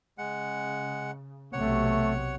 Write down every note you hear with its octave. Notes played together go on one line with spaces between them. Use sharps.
C#3 G#3 F#5
B1 C3 A3 C#5 F#5